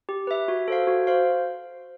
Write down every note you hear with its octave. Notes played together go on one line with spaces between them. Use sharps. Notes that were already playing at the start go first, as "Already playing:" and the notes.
G4
B4 E5
F#4
A4 C5 F5
F#4
C5 F5